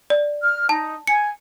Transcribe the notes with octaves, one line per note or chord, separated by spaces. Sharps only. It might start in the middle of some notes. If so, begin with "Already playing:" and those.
D5
F6
D#4 A5
G#5 C#7